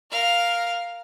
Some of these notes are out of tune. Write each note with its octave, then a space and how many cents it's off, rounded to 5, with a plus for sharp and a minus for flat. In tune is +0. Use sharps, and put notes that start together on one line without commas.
A#4 +0 F5 +0